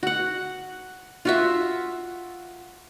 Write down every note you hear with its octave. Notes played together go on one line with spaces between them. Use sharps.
F#4 F#5
F4 F#4 E5